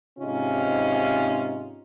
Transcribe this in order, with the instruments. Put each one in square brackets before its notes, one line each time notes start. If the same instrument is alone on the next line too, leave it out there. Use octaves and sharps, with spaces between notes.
[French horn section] G#2 C3 C#4 D#4 F4